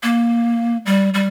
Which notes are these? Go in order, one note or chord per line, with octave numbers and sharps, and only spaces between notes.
A#3
G3
G3